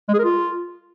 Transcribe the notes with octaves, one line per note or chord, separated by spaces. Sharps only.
G#3
G#4
A#4
F4